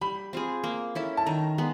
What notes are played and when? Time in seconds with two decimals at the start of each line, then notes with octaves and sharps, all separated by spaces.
0.01 G3 B5
0.33 C4 F4 G#4
0.64 A#3
0.95 C#4 E4 A4
1.17 A5
1.26 D#3 A#5
1.58 G#3 B3